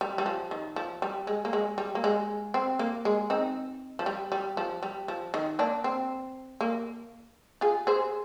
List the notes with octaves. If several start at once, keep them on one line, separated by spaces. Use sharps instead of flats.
G3
G3
F3
D#3
F3
G3
G#3
A#3
G#3
G3
A#3
G#3
C4
A#3
G#3
C4 D#4
F3
G3
G3
F3
G3
F3
D#3
A#3 D4
C4
A#3
F4 G#4
G#4 C5